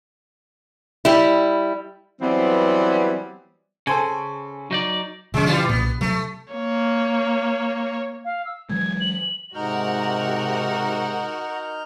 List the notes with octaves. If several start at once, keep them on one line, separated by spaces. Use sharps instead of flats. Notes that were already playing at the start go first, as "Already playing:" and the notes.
G3 E4
E3 F#3 G3 B3 C4
C#3 A4 C5 G#5
F#3 D#4 D5
B2 D3 F3 G#3 C#4
E3 G3 F4
B1 A#2 B3
C3 F#3 G3 A3
A#3 C#5
F5
E6
E3 F#3 G#3 G#6
F#7
G#2 C3 D#4 F#4 A#4 F#5 F6 G6